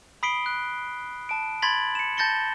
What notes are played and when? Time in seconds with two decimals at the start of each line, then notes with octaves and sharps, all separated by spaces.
0.23 B5 D#6 B6 C7 D7 G7
0.46 F#6
1.29 A5 D7
1.62 B5 C6 G#6 A6 B6 F#7
1.95 C#7 E7
2.17 A5 G6 A6 A#6 C#7 G7